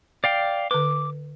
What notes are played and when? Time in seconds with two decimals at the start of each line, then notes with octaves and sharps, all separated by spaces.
0.24 D5 F5 G5
0.71 D3 B4 D6